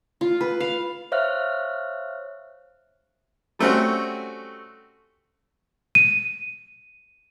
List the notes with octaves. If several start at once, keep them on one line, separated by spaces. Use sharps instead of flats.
F4
B4
F5
C5 C#5 E5 F5 F6 F#6
G3 A3 C4 C#4 F#4
D#7